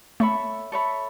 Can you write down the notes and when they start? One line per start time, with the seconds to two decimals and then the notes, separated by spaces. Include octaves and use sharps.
0.20 A3 A4 C#5 E5 B5
0.72 A4 C#5 E5 B5